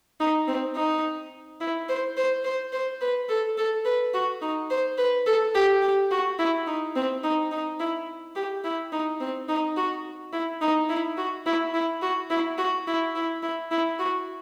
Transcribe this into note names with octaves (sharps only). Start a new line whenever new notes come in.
D#4
C4
D#4
E4
C5
C5
C5
C5
B4
A4
A4
B4
F#4
D#4
C5
B4
A4
G4
G4
F#4
E4
D#4
C4
D#4
D#4
E4
G4
E4
D#4
C4
D#4
F#4
E4
D#4
E4
F#4
E4
E4
F#4
E4
F#4
E4
E4
E4
E4
F#4